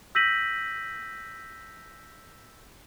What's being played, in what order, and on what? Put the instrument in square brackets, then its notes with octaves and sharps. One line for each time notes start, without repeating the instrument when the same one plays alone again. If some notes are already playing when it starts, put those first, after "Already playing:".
[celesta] E6 G6 A#6 B6 D#7 F#7